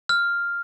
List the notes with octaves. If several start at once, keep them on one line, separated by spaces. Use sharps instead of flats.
F6